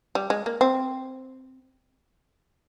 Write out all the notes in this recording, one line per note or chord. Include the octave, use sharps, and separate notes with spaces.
G3
G#3
A#3
C4